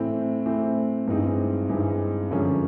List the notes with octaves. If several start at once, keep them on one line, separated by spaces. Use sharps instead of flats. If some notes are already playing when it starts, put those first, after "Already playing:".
Already playing: A2 E3 A3 C4
A2 E3 A3 C4
G2 E3 G#3 C4 D#4
G2 E3 G#3 C4 D#4
F#2 D3 F3 G#3 C#4